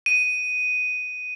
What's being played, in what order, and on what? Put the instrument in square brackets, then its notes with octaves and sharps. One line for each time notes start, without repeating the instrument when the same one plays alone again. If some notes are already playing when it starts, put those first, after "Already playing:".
[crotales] D#7